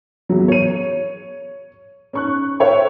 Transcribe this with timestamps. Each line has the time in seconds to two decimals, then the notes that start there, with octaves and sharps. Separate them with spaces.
0.29 E2 F#3
0.48 C#5 D#7
2.13 C#4 C#6 F#6
2.60 C5 C#5 E5 F5 G5 C#6